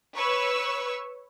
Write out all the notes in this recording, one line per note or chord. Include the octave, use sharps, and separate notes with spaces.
B4 C#5 C#6 E6